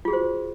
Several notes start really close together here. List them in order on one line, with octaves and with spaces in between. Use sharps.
F4 G#4 F#4 C5